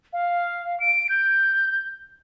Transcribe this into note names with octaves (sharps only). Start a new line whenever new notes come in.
F5
D7
G6